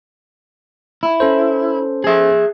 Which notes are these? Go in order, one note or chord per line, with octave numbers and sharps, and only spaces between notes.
E4
C#4 A4 C5
G#4 E5